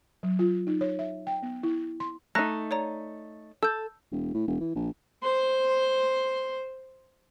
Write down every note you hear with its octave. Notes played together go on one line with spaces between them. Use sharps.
F#3
F4
D#4
C#5
E5
G5
B3
E4
C6
A3 D#4 A#5 F#6 A#6
C#5 D5 A#5
A4 E6 G6
E1
A2
E1
E3
A#1
C5 C6